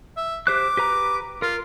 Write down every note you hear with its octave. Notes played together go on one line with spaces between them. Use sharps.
E5
G4 C5 D6 F#6
G4 B4 A#5
F4 A#4